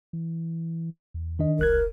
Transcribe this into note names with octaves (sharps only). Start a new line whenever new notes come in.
E3
E2
D#3 D4 D#5
E1 C2 A#4 F#6 G#6